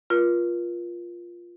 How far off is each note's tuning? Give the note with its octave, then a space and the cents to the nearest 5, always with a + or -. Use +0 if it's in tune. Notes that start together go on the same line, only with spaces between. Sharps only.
F4 +0 A#4 +45